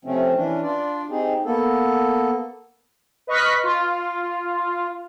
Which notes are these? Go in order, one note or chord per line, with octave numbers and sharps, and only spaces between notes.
C3 F3 A3 C4 C#4
E3 C#4 D4
D4 F4 D5
C4 D#4 G4 G#4
A#3 B3 A4
B4 D#5 C#6 F6 F#6 B6
F4